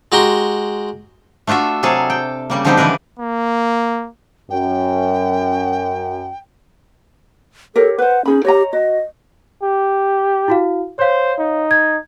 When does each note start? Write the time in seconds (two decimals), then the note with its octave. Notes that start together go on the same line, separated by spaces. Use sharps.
0.12 G#3 F#4 G4 A#5 C6
1.47 A3 D4 F4 F#4 E5
1.83 C3 F#3 G#4 A4 F5
2.10 G5
2.50 C#3 G3 A#3
2.65 D3 F3 G3 C4 D#4 G4
2.77 C#3 E3 D4 A#4 B4
3.20 A#3
4.50 F#2 G5
7.76 G4 A4 A#4 C#5
7.98 B4 C5 F#5
8.25 C#4 D#4 G#4 B5
8.45 G4 C#5 D#5 A#5
8.73 F#4 D#5
9.63 G4
10.48 E4 F#4 F5
10.99 C5 C#5 F5
11.39 D#4
11.71 G#6